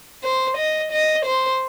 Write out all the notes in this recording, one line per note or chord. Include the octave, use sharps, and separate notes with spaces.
C5
D#5
D#5
C5